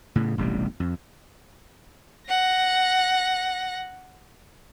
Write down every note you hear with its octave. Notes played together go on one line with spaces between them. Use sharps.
A2 C#3
E1 A1 C3 G3
F2
F#5 A#6